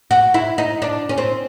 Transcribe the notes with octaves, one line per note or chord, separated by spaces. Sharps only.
F#4
E4
D#4
D4
C#4
C4